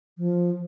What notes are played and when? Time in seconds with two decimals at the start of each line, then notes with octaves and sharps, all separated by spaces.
0.18 F3